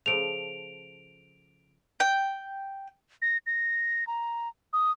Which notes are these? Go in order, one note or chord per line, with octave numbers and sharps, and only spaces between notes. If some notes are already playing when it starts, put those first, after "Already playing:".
C#3 F3 A3 D7 F7
G5
A#6
A#6
A#5
D#6